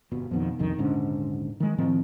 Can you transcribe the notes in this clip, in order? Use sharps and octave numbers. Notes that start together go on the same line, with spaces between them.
G1 B2
F2 B2 D#3
F1 B1 F2 D#3
D#1 G#2 D3 C#4
D#3 G#3
A2 D#3 F3 C4